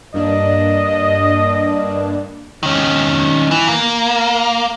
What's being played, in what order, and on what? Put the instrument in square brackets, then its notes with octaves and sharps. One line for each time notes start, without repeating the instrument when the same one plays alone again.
[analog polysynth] G2 A#3 D4 [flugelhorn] D#5
[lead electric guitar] D#3 C#4
E3
A#3